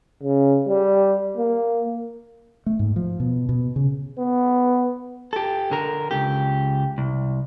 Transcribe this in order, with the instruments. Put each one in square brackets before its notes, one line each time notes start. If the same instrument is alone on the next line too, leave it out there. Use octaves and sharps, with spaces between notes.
[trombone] C#3
G3
A#3
[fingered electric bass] A3
G#2
F3
B2
B2
C#3
[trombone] B3
[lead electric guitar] G4 A4
D3 A#4
C#2 G4
C2